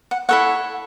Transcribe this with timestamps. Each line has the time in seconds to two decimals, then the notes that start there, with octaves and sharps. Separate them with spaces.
0.11 F#5
0.29 E4 A4 C#5 F#5